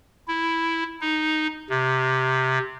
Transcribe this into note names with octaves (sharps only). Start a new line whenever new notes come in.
E4
D#4
C3